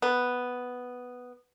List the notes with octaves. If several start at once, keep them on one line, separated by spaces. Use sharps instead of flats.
B3